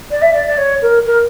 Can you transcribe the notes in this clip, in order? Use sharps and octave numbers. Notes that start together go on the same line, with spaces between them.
D5
E5
D5
D5
C#5
A#4
A#4